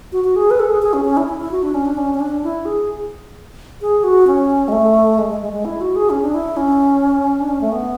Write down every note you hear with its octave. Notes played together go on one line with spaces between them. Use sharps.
F#4
F#4
G#4
B4
A4
G#4
G#4
C#4
C#4
E4
E4
E4
F#4
D4
C#4
D4
C#4
C#4
D4
E4
G#4
G#4
F#4
C#4
G#3
A3
G#3
G#3
G#3
G#3
E4
F#4
G#4
C#4
D4
E4
C#4
D4
C#4
A3
B3